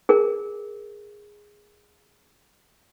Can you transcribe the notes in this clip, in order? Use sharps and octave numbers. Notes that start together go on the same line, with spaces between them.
G#4 A#4